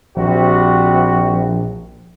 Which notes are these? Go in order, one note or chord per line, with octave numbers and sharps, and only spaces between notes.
A#1 C3 G3 F#4